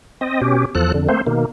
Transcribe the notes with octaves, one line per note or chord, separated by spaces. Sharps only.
C4 D#5
B2 C#4 G4
E2 F3 A4 F#6
F2 D3
A3 A#3 C4 C5
B2 D#3 A#3